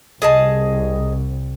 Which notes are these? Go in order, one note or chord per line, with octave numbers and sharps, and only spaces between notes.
C2 G#4 D#5 A5